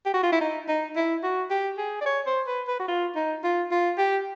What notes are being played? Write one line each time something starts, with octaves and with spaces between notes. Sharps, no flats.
G4
F#4
F4
E4
D#4
D#4
E4
F#4
G4
G#4
D5
C#5
C5
B4
B4
F#4
F4
D#4
F4
F4
G4